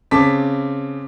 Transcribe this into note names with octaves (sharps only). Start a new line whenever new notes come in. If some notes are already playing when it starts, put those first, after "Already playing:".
C#3 C4 A5 D6 B6